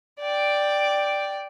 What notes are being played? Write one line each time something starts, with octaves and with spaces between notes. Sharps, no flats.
D5 G5